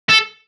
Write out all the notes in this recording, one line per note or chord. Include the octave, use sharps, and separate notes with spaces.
A4